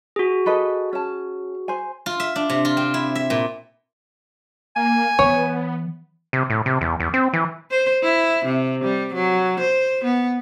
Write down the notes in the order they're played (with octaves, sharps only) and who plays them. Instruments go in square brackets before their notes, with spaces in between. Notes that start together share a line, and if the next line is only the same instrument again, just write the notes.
[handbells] F#4 G#4
[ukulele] A4 B4 D#5
C#4 A5
C5 G#5
[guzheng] F4
E5
D4
C3
F4
C4
E4
E5
A#2
[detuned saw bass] A#3 [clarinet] G#5
[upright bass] E3 [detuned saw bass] B3 [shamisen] C#5
[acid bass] C3
A2
C3
E2
E2
C4
E3
[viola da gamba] C5
E4
C3
G3
F#3
C5
B3